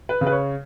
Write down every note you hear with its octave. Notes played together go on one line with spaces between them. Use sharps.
B4
C#3
B4
C#5